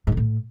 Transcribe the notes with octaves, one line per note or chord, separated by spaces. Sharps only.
G#2
D3
A2